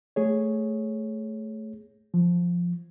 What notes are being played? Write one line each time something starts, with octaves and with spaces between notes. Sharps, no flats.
A3 G#4 C#5
F3